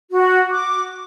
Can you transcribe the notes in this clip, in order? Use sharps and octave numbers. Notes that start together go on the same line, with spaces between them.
F#4
D6